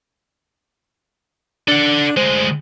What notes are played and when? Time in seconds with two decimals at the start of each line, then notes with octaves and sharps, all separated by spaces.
1.68 D4 A4 F#5
2.17 D2 G#3 C5